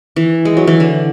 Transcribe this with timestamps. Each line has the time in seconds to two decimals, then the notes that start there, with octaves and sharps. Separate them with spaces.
0.16 E3
0.45 G#3
0.57 F#3
0.67 E3
0.80 D3